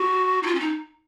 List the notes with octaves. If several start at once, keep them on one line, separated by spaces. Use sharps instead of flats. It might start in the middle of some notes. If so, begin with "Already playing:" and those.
Already playing: F#4
D#4
F4
C#4
D#4